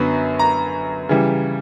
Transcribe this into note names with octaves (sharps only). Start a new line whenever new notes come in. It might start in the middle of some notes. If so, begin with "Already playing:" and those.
Already playing: F#2 D3 F#3 B3 B5
A#5
C#3 E3 G3